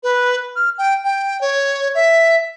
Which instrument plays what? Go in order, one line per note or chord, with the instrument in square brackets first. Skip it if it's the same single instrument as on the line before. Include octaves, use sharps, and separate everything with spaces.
[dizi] B4
F6
G5
G5
C#5
E5